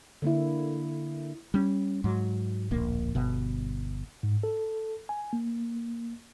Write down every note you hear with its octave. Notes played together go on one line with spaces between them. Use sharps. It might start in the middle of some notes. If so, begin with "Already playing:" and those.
D3 A#3 E4
G3 C#4
G#2 F#3
D1 A#1 A#3
G1 B2
G#2
A4
G#5
A#3